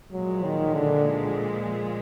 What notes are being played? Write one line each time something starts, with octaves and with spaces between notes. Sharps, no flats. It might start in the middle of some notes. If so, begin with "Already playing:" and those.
A#2 F3 F#3 G#3
D#3
D3